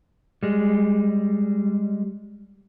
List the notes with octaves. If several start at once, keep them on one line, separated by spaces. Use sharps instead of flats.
G3 G#3